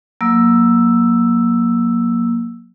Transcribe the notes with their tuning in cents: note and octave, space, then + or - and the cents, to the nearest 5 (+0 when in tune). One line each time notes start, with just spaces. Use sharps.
F#3 -25 A#3 +10 E6 +0